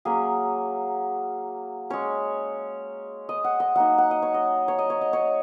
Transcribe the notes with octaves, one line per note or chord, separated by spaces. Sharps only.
F#3 A#3 C#4 G#4
G#3 C#4 C#5
D#5
F#5
D#5
F#3 A#3 D#4 F#5
F#5
D#5
C#5
D#5
C#5
D#5
C#5
D#5
C#5